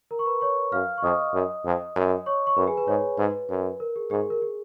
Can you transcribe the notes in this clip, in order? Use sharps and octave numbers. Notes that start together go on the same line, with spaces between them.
A#4 A#5
C#6
B4 B5
C#5 C#6
F#2 F5 F6
C#6
F2 D#5 D#6
F#2
F2
F#2
C#5 C#6
C#6
F#2 B4 B5
G#4 G#5
B4
G#2 C#5
G#2 B4
F#2
A#4
G#4
G#2 G#4
A#4
G#4